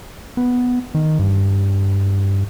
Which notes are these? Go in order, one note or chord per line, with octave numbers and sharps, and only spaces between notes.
B3
D#3
G2